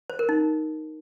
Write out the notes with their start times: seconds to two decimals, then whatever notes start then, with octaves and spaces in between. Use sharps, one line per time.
0.10 C5
0.19 A#4
0.29 D#4